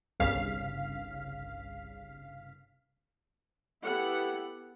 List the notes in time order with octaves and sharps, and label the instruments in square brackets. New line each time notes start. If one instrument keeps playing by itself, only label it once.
[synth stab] G1 C2 G2 C#3 F5 B6
[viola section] B3 E4 G4 A4 F#5